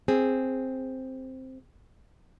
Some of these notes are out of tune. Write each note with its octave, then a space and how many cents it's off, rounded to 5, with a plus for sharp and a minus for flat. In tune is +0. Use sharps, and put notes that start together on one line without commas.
C4 +0 G#4 +0